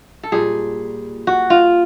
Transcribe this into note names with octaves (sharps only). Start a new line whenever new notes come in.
A4
A#2 G3 G#4
F#4
F4